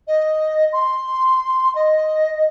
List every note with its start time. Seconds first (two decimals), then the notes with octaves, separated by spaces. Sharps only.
0.07 D#5
0.72 C6
1.75 D#5